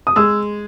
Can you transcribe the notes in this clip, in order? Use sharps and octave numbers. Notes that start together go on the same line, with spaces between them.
D#6
G#3 E6